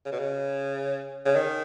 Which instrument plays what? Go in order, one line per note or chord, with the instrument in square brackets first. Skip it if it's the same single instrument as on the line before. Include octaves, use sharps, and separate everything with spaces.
[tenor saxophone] C#3
B2
C#3
C#3
D#3